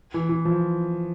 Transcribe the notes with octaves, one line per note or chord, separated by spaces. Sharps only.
E3
E3
F3